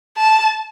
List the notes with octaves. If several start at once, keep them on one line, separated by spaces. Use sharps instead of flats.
A5